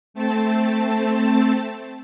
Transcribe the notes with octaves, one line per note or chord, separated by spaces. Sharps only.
A3 C4 A5